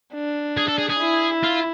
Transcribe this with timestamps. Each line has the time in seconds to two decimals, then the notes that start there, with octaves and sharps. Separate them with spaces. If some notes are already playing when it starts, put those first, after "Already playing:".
0.14 D4
0.57 G#4
0.68 A4
0.78 G#4
0.89 G#4
1.00 E4
1.44 F4